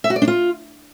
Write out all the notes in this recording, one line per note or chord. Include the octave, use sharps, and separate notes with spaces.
E5
F#4
D5
D4
F4